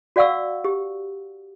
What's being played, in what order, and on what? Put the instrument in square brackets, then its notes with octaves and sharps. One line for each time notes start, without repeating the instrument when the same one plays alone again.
[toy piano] F#4 D5 F5 F#5 C#6 E6
G4